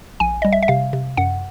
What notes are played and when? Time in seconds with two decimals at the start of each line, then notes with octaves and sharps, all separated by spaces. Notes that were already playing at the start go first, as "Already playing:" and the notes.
0.20 A#1 G#5
0.42 G3 D#5
0.52 E5
0.63 E5
0.68 C3 F5
0.93 C3
1.17 F#2 F#5